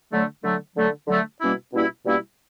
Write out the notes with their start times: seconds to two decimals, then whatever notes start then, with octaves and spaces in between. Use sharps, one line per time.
0.12 D3 F#3 A3
0.44 D3 F#3 A3
0.76 D3 F#3 A3
1.08 D3 F#3 A3
1.40 B2 G3 A#3 C#4 E4
1.73 B2 G3 A#3 C#4 E4
2.05 B2 G3 A#3 C#4 E4